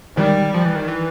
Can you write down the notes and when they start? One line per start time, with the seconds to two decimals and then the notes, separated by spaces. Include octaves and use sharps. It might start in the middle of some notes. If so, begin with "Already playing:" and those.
0.17 D#3 G3
0.54 F3
0.65 E3
0.76 D#3
0.88 E3